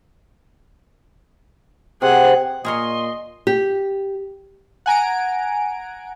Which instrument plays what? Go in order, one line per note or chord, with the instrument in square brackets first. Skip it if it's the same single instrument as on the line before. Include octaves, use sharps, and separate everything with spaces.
[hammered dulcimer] C3 [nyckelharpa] G#4 F#5
[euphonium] A#2 [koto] G#4 A#4 C#5 [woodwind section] D#5 [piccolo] C6
[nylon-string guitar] G4
[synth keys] F#5 G#5 A#5 D7